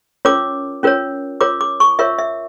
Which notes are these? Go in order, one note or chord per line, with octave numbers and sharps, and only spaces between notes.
C#4 F4 A#4 C#5 D6
C#4 F4 A#4 C#5
F4 A#4 C#5 D6
D6
C#6
F4 A#4 C#5 E5
E5